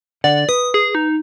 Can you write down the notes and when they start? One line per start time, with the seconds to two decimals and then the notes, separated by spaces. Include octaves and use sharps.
0.24 D3 D5 F#5
0.49 B4 D#6
0.74 G#4
0.95 D#4